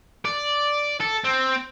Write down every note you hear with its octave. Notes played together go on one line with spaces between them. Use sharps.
D5
A4
C4